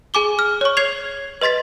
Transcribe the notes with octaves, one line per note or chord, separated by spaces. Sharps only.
G#4 G#5 D6 G7
F6
C#5 C#6
C#5 G#6 C7 F7
B4 D#5 C6 A6 B6